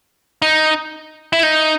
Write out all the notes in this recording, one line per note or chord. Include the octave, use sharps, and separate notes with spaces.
D#4
E4
D#4